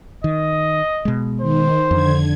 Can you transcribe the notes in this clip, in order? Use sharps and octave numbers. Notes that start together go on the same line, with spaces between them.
D#3 D#5
B2 G#3
D#3 C5
F2 D3 G#6